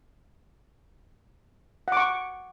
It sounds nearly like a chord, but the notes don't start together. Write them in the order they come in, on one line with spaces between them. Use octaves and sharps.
F#5 D6 C#6